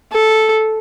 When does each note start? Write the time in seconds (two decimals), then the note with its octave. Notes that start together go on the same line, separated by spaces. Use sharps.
0.12 A4